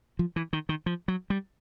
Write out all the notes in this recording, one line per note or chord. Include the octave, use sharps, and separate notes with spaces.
F3
E3
D#3
D#3
F3
F#3
G3